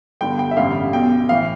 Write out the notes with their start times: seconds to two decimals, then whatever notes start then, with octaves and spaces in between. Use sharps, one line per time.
0.21 G1 G2 D3 G5
0.39 G5
0.51 E5
0.57 A1 G2 D3 F5
0.93 B1 B2 G5
1.29 A2 E3 F5